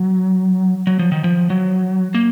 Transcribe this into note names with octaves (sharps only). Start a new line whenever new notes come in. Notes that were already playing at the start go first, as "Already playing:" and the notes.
Already playing: F#3
F#3
F3
D#3
F3
F#3
A#3